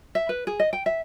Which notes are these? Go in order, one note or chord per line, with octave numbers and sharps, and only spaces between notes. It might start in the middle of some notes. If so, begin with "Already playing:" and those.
E5
B4
G#4
D#5
G5
E5